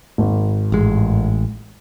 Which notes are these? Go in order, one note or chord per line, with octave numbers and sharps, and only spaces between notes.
G#1
A1 G#3